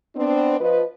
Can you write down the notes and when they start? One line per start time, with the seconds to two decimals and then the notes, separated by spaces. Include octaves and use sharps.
0.16 B3 C4 D4
0.60 F3 B4 D#5